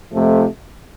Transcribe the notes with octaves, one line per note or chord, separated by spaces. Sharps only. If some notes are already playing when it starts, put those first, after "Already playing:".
F2 C3 F3 A3